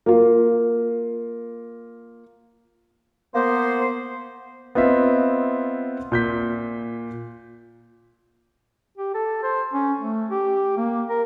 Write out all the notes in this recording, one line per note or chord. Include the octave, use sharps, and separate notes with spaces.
A#3 F4
A#3 B3 C5
B3 C4 F4 D#5 E5
A#2 G6 B6
G4
A4
C5
C#4
A3
G4
A#3
A#4